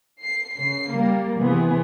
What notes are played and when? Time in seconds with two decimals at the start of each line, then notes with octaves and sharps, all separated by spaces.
0.23 C7
0.54 C#3 C7
0.95 G3 A#3
1.38 C3 E3 B3 G#4